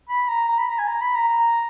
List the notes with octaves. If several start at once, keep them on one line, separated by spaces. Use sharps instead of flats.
B5
A#5
A#5
B5
A#5
G#5
A#5
B5
A#5
A#5